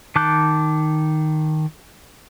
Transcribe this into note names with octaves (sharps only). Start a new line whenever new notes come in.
D#3 A5 D6 F#6 G6